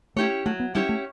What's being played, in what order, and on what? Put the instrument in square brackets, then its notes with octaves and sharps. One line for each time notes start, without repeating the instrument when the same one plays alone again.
[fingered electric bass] A3 [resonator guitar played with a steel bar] C#4 E4 G4 C#5
[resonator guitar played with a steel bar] F#3 [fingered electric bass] A3
[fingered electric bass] B3
[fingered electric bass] G3 [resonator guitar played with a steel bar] C#4 E4 G4 C#5
[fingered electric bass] A3